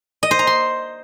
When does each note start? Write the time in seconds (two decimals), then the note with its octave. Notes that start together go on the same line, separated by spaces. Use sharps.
0.23 D#5
0.31 C5
0.39 A#5
0.47 C6